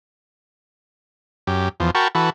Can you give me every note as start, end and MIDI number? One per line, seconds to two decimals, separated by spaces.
1.47 1.69 42
1.47 1.69 67
1.80 1.91 40
1.80 1.91 53
1.95 2.08 66
1.95 2.08 70
1.95 2.08 79
1.95 2.08 81
1.95 2.08 83
1.95 2.08 85
2.15 2.30 52
2.15 2.30 66
2.15 2.30 69
2.15 2.30 71